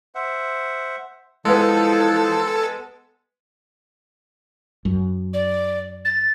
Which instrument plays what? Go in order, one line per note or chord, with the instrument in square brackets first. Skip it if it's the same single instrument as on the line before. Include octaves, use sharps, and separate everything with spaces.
[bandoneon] C5 E5 F#5
[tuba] E3 [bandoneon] F3 D#4 F5 [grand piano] G#3 B3 [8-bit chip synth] A4
[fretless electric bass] F#2
[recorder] D5
A6